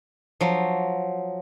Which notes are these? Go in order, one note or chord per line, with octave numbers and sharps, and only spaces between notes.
F3 F#3